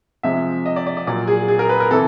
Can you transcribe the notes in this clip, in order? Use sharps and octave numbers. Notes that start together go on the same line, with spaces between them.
C3 F3 G#3 E5
D#5
D5
D5
D5
A#2 F#3 A#3 D5
G#4
G#4
A#4
B4
A#4
C3 E3 A4